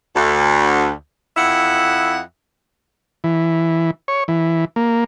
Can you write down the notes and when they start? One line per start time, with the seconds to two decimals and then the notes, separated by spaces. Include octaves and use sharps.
0.15 D2
1.36 F2 E4 E5 F#5
3.24 E3
4.08 C#5
4.28 E3
4.76 A#3